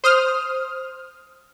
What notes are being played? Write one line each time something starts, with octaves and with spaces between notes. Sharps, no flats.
C5 D#6 F6